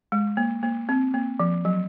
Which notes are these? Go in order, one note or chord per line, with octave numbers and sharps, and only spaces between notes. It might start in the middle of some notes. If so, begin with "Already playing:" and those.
G#3
A#3
A#3
C4
A#3
F3
F#3